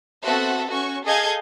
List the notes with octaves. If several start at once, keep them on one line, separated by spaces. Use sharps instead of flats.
B3 C4 F#4 A4 E5 F#5
C#4 F#4 C#6
G#4 A4 D#5 F5 G6 G#6